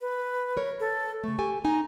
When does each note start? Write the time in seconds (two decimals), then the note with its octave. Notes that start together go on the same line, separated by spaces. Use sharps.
0.01 B4
0.57 A#4 C#5
0.80 A4
1.24 C#3 A3 C#6
1.39 G4 A4 G#5
1.65 D#4 G#5 A#5